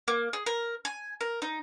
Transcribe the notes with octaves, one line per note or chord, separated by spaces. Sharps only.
A#3
G#4
A#4
G#5
A#4
D#4